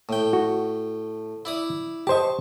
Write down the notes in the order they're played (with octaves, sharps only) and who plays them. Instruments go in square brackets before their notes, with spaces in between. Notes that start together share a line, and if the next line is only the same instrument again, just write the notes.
[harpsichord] A2 G5
[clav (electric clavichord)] F#4
[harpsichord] E4 D5 D#6
[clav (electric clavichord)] G4 C5 D#5 [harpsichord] A5 C#6